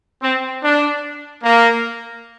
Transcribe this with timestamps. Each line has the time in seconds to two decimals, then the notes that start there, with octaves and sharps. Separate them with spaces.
0.21 C4
0.63 D4
1.43 A#3